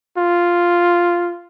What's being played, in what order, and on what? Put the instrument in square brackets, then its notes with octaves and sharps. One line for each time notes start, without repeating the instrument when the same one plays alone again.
[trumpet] F4